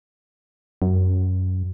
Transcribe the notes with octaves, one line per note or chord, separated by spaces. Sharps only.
F#2